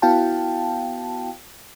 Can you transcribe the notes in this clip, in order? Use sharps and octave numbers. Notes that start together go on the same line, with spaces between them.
B3 E4 F#4 F5 G5 A5